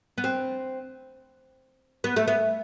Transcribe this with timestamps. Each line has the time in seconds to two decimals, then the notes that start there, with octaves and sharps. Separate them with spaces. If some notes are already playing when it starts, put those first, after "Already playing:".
0.18 B3
0.24 C4
2.04 B3
2.16 A3
2.28 B3